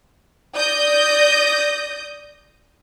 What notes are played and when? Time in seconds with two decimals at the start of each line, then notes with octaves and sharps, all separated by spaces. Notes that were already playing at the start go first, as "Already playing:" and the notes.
0.55 D5 D#6 G6 A#6